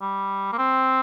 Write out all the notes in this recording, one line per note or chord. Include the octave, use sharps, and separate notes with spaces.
G3
A#3
C4